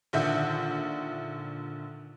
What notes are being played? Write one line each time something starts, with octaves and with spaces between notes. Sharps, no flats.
A#1 D3 D#3 E5 F#5 G6